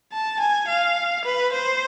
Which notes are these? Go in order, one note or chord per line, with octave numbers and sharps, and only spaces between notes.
A5
G#5
F5
B4
C5